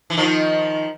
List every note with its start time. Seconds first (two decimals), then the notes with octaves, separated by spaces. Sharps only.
0.10 E3
0.17 D#3 F3